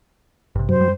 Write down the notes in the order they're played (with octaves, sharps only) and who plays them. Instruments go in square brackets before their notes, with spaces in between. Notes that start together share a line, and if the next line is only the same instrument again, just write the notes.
[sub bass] A1 [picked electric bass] G2 C3
[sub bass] F#2 [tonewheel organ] F#3 [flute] C5
[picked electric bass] G3